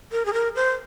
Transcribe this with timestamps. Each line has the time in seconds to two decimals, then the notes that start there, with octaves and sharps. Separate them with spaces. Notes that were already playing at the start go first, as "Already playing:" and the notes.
0.12 A#4
0.26 G#4
0.33 A#4
0.56 C5